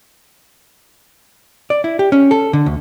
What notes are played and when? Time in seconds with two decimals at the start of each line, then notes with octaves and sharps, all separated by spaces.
1.70 D5
1.84 E4
1.99 G4
2.12 C#4
2.31 A4
2.53 D3
2.66 D2